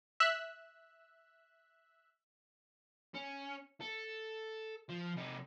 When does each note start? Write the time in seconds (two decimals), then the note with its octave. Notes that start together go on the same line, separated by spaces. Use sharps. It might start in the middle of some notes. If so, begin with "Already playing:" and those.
0.20 E5 E6 F#6
3.14 C#4
3.81 A4
4.89 F3
5.16 C3 D#4